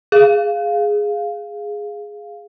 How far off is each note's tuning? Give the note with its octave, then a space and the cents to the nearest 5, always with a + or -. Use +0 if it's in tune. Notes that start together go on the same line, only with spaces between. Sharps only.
G#4 +0 F5 +0